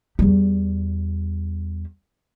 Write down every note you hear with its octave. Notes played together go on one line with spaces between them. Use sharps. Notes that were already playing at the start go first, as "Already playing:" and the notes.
E2 G3